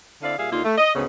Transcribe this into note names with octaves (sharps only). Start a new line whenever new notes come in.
D3 C4 E4 D5 F5
A#2 G3 G#4 E5 F5
D#2 D3 A#3 D#4 F4
A3
D#5
D2 G#2 C#3 B3 C#4